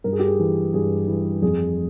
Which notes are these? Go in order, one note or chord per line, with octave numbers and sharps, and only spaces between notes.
G2 A#4
G#4
G4
G#4
E3
G2 G#4
E3
F2 G#4